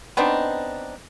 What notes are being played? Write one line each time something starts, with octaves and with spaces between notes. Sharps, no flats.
B3 C4 D4 D#4